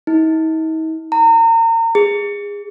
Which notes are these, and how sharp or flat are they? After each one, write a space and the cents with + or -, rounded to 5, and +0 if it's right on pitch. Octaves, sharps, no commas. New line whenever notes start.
D#4 +45
A#5 -35
G#4 -25